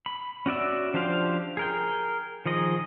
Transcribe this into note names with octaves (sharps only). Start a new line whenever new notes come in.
B5
C#4 F#4 D5 E5
F3 D4 G4 C5 F5
G#4 A#4 G5
D#3 F3 G#4 D#5